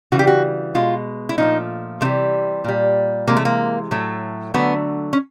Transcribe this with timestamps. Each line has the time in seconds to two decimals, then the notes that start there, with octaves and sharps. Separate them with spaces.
0.12 C#3 E3 G3 F#4
0.19 G4
0.27 F#4
0.75 B2 G#3 F4
1.29 E4
1.38 A#2 F3 A3 D#4
2.01 C3 E3 G3 A3
2.64 A#2 G3
3.28 C3 E3 G#3 A#3
3.37 A3
3.45 A#3
3.91 A2 F#3 A3
4.54 D3 F#3 A3 B3
5.13 C#4